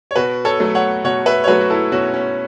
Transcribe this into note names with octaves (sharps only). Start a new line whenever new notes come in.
C#5
B2 F#4 B4
A4 C#5
F#3 A3
C#5 F#5
B2 C#5 F#5
B4 E5
C#5
F#3 A3 F#4 B4
F#4
E4 A4
B2 C#4 F#4
C#4